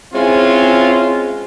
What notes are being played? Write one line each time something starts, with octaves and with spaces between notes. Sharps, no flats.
G#3 C4 C#4 E4 F4